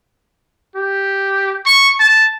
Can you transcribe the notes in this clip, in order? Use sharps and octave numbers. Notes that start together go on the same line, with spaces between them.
G4
C#6
A5